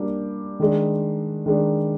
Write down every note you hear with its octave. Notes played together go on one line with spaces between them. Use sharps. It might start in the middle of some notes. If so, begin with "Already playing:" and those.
Already playing: G3 A#3 D4 G4
D#3 G#3 D4
D#3 G#3 D4